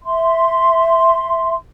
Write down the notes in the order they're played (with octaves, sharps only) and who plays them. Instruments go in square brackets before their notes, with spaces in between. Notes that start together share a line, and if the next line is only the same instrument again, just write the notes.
[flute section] E5 C6